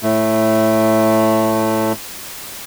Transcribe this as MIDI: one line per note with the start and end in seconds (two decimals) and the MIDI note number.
0.03 1.93 45
0.03 1.93 57